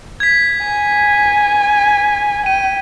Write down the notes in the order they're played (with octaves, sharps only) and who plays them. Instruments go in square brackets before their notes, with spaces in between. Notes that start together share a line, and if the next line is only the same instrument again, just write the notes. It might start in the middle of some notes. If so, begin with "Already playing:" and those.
[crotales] G#6 B6
[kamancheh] G#5
[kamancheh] G5 [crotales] D#7